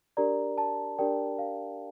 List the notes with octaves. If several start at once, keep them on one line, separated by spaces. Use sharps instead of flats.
D4 G4 A#4 D5 A#5
A5
D4 G4 A#4 D5 G5
F5